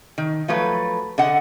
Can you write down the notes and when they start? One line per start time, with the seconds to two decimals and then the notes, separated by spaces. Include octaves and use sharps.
0.18 D#3
0.48 F3 F#3 A3 B4
1.18 D3 D#5 F#5